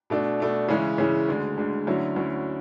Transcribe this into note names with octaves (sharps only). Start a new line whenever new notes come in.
B2 A3 D4
B2 A3 D4
C#3 E3 G#3 C#4 E4
C#3 E3 G#3 C#4 E4
D2 D3 G#3
D2 D3 G#3
D2 D3 F#3 C#4 E4
D2 D3 F#3 C#4 E4